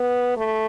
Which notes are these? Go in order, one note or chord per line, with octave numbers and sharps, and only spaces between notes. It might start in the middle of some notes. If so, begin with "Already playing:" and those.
Already playing: B3
A3